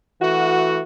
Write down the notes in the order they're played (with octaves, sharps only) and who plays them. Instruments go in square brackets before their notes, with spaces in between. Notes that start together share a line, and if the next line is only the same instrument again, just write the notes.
[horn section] E3 A3 F#4